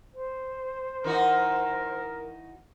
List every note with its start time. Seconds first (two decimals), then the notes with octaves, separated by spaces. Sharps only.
0.14 C5
1.04 E3 D#4 F#4 A#4